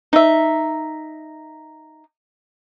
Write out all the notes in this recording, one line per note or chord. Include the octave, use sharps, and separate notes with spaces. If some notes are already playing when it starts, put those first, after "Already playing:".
D#4 E5